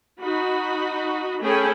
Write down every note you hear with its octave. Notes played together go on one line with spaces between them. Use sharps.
D#4 F#4 B5
A3 C#4 G#4 A4 G5 B5